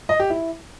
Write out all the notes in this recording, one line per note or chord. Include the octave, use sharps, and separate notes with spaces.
D#5
G4
E4